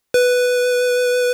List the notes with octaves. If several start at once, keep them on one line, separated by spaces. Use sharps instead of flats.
B4